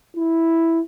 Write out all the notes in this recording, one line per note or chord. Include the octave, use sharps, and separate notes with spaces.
E4